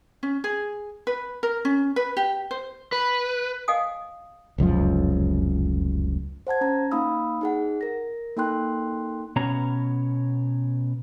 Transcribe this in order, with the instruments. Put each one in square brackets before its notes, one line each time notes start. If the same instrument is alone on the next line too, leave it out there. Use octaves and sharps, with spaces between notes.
[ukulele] C#4
G#4
B4
A#4
C#4
B4
G4
C5
[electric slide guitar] B4
[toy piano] D#5 F5 F#5 G#5 D#6
[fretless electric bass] F1 C#2 F#2 F3
[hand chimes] C5 F#5 A5 G#6
C#4 A#5
A#3 D#4 F5 B5 D#6 E6
D#4 G#4 F#5
A#4 A#6
A#3 D#4 A4 G5 C6 F#6
[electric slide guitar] B2 B3 C#4 C#5 A#5